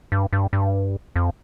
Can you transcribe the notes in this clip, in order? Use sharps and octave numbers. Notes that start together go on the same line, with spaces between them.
G2
G2
G2
F2